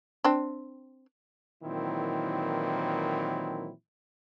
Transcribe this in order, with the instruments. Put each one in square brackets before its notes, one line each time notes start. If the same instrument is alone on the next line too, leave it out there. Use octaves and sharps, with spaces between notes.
[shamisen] C4 D4
[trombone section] A#2 D#3 E3 F#3 C4 E4